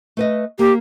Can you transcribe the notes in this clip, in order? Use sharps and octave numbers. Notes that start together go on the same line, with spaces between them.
A3 B4 D#5
A#3 G4